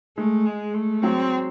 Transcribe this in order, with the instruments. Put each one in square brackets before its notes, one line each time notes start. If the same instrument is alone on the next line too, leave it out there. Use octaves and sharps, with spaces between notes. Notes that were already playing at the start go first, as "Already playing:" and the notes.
[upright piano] G#3 [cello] A3
[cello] G#3
A3
[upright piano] F#3 [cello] C4